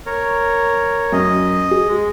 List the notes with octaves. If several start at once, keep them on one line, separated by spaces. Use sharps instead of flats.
A#4 C#5
F#2 D#5
G#4
G#3